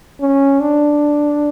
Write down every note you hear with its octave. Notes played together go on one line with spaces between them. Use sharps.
C#4
D4